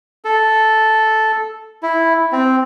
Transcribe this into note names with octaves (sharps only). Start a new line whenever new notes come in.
A4
E4
C4